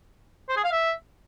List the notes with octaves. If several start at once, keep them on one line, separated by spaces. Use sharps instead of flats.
C5
G#4
F5
E5